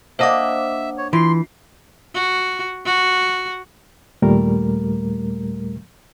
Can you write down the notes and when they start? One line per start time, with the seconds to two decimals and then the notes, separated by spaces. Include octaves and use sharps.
0.19 A#3 D4 C5 D#5 E5 F#5 D6
0.98 C#5
1.13 E3 F4 C6 C7
2.15 F#4
2.86 F#4
4.22 D#2 A#2 G3 A3 A#4